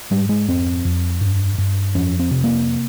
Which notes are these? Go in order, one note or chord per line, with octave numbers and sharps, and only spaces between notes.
G#2 G3
G#3
F2 C4
F2
G2
G2
F2 C#4
C4
C3
A#3